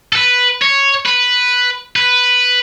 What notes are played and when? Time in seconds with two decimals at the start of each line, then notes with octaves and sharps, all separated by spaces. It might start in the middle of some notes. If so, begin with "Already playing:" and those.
0.13 A4
0.16 B4
0.62 C#5
1.06 B4
1.96 B4